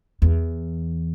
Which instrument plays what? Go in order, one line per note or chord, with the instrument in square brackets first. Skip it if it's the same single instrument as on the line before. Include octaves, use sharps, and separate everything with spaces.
[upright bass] E2